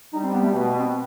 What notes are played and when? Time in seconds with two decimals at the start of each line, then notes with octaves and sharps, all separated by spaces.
0.13 G3 D#4
0.23 C4
0.33 B3
0.42 A3
0.52 B2 A3
0.79 C4